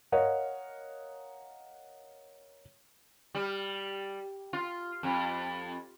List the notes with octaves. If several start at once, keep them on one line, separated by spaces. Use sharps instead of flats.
A#4 C#5 D#5 F5 F#5
G3
F4
F2